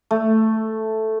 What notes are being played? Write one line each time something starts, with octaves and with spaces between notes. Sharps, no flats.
A3